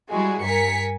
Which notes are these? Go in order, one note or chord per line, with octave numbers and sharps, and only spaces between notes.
G3 G#3 E4 F#4 G#4
G2 A#4 G#5 B6 C#7